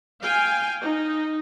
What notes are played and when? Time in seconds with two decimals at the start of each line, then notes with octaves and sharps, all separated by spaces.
0.22 F5 G5 G#5
0.83 D#4